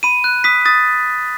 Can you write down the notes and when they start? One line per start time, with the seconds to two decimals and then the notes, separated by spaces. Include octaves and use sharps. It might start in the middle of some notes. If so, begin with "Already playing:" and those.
0.03 B5 D#7
0.24 F#6
0.44 D#6 B6
0.65 D#6 A6